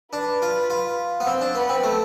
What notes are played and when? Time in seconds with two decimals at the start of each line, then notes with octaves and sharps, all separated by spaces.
0.13 D4 B4
0.42 F4
0.70 F4
1.20 B3
1.27 C4 C5
1.41 D4
1.55 B3 B4
1.69 C4
1.84 A3